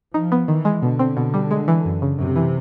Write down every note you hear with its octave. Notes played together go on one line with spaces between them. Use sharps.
F3 D#4
B3
D#3 E3
G#3
B2 D3
C4
B2
G3
G#3
E3
F#2
C#3
F#2 C3
E3